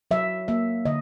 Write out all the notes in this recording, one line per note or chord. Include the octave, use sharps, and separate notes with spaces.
F#3 E5
A#3 E5
D3 D#5